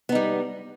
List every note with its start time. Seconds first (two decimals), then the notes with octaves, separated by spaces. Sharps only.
0.09 B3
0.12 D#4
0.15 G3